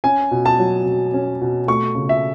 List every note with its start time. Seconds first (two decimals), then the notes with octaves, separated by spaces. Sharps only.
0.04 C#4 G#5
0.31 B2
0.46 A5
0.59 F#3
0.85 B2
1.14 C#4
1.41 B2
1.67 A3 C#6
1.95 C#3
2.09 E5